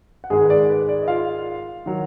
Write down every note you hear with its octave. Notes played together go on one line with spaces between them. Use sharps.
F#5
G#2 D#3 G#3 G#4 G#5
B4
D5
B4
D5
D#5
F4 F5
D#3 F#3